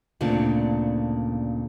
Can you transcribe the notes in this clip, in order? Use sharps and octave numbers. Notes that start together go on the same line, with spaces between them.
D2 A#2 C#3 C4 D4